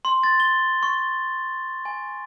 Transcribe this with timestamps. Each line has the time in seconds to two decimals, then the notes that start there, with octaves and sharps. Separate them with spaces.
0.05 C6
0.23 A6
0.40 G7
0.83 C#6
1.85 G#5